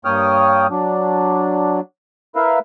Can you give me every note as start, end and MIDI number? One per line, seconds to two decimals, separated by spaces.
0.05 0.67 43
0.05 0.67 58
0.05 0.67 73
0.05 0.67 79
0.05 0.67 87
0.05 0.67 89
0.70 1.80 54
0.70 1.80 62
2.36 2.59 64
2.36 2.59 70
2.36 2.59 71
2.36 2.59 76
2.36 2.59 77